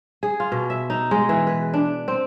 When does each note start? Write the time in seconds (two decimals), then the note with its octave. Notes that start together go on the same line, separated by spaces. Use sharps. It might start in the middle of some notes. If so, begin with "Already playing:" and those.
0.23 G#4
0.40 F4
0.52 B2
0.70 E5
0.90 D#4
1.11 G#3
1.29 E3
1.47 B4
1.74 D4
2.08 C4